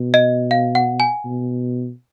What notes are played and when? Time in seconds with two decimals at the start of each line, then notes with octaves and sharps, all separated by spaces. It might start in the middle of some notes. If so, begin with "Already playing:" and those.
Already playing: B2
0.14 D#5
0.51 F5
0.75 F#5
1.00 G#5
1.25 B2